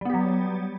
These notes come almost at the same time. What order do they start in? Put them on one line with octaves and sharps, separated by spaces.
G3 B3 G4 F#3